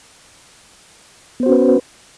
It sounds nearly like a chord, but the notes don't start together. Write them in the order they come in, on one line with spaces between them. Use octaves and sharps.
B3 C5 F#4 C#4 B4